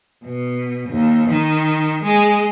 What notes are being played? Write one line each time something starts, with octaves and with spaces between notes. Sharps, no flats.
B2
D#2
D#3
G#3